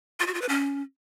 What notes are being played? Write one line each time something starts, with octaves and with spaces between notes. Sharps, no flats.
F4
F#4
F4
B4
C#4